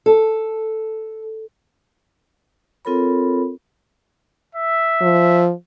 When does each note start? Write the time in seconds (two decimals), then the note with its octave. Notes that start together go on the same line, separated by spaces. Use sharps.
0.06 A4
2.85 C4 F4 A4 A#4 C#5 B5
4.55 E5
5.01 F3